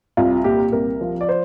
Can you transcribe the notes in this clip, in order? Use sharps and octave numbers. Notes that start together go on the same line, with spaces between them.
C2 F4
A#2 G4
C2 A#4
F3
D5
C5